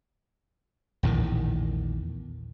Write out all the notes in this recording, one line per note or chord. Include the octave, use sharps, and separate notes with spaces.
A#1 E2 A2 D#3